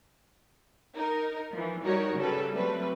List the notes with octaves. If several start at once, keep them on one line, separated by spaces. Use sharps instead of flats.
D#4 A#4
E3 F3
G3 D#4 F#4 A#4 C#5
C#3 G3 A4 B4
F#3 G3 A3 C4 B4